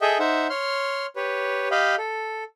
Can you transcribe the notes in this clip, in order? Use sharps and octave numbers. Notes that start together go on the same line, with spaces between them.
G#4 A4 D#5 E5 G5
D#4 C5 E5 F#5
C#5 C6 F6
G4 B4 C#5
G4 D#5 F5 G5 B5
A4